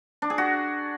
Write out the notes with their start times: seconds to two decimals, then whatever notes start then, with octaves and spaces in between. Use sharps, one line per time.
0.22 D4
0.30 G#4
0.38 F#4